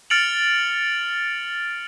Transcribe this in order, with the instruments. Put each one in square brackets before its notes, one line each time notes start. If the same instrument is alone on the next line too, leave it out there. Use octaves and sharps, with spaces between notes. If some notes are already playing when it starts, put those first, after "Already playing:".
[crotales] F6 A6 C#7 D7 F7 F#7